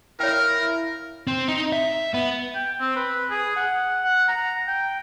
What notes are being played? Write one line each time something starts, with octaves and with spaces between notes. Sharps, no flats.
E4 A#4 C#5 F5 G5
C4
D#4
E5
B3
G5
C4
B4
G#4
F#5
F#5
A#5
G5